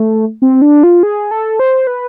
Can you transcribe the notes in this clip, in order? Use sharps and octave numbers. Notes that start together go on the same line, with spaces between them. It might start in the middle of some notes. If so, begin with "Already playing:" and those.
Already playing: A3
C4
D4
F4
G#4
A4
C5
B4